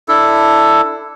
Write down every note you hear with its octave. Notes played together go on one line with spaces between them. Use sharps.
D4 E4 A4